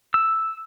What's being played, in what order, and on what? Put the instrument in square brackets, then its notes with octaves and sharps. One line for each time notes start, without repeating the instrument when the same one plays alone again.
[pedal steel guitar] E6